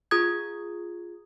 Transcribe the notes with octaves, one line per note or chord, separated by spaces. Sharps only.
F4 G#4 A#5 D#6 G#6